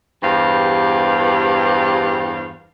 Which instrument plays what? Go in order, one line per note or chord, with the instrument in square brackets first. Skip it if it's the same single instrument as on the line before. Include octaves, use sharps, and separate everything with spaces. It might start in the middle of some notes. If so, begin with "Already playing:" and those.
[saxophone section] E2 G2 G4 C5 F5